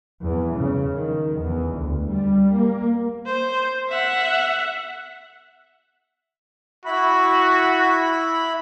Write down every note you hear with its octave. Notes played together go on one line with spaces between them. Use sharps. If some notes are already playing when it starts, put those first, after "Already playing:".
E2
C#3
D#3
E2
D2
G3
A#3
C5
E5 F#5
E4 F#4 B5